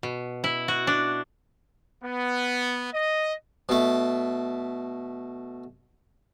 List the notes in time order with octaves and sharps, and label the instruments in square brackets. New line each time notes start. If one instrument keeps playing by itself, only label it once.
[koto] B2
E4
F#4
D4
[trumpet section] B3
D#5
[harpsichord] B2 A3